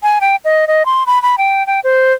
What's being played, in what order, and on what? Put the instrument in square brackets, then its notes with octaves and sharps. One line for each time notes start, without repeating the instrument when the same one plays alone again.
[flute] G#5
G5
D#5
D#5
C6
B5
B5
G5
G5
C5